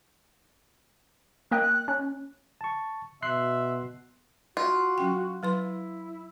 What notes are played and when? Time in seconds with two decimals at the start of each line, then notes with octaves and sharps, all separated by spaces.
1.51 A#3 D#5 G5 F#6
1.88 C#4
2.61 A5 C#6
3.22 B2 E5 C6 F#6 C7
4.57 F4 F#4
4.98 F#3 C#4 G5
5.43 F#3 E4 B4 C6